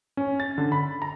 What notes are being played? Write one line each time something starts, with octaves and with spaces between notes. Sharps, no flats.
C#4
A6
D3
B5
A#5